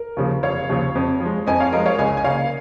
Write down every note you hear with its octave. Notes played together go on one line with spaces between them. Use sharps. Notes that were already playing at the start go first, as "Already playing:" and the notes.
Already playing: A#4
D#2 C#3 F3
F1 C#5 F5
D#2 C#3 F3
F2
F3
G#3
F2 D#5 G#5
C#5 F5
F3 G#3 A#4 D#5
C#5 F5
C#2 D#5 G#5
G#5
C#3 A#3 C#5 F5